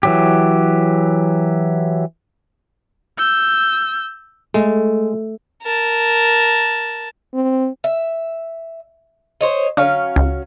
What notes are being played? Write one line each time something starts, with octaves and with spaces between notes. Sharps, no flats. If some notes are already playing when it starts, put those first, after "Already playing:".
E3 F#3 G4
E6 G6
G#3 A3
A#4 A5
C4
E5
C5 C#5 D#5
D3 F#3 C#4 F5
C#2